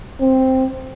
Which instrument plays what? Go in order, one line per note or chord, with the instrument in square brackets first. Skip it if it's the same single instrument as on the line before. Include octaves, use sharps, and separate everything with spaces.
[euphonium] C4